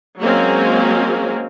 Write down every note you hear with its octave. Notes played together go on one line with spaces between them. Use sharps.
F#3 G#3 A#3 C4 C#4